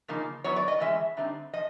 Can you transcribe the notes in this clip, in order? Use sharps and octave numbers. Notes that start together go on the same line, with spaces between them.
C#3 F3 A#3 D#4
F#3 B3 E4 C#5
D5
D#5
A2 E3 G#3 C#4 E5
D3 G3 C4 D#4
F3 D#5